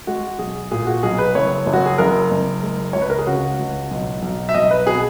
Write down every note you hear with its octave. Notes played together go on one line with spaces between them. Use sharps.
G#3 F#4
B1 G#4
A#2 G#4
F#4
B1 G#4
B4
F#1 C#5
F#1
F#4
G#4
F#1 A#4
F#1
G#3
C#2 C#5
B4
A#4
G#4
C#3 F#4
C#2
B1
B1
E5
B1 D#5
B4
B2 G#4